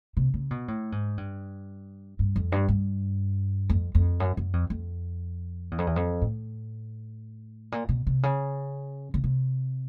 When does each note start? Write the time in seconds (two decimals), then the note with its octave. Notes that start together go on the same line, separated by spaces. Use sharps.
0.17 C3
0.34 C#3
0.51 B2
0.68 A2
0.92 G#2
1.17 G2
2.19 G2
2.36 F2
2.52 G2
2.69 G2
3.70 F2
3.95 F2
4.20 F#2
4.37 F#2
4.53 F2
4.70 F2
5.71 E2
5.78 F2
5.87 E2
5.96 F2
6.22 A2
7.72 A#2
7.89 B2
8.07 C3
8.23 C#3
9.14 C#3
9.24 C3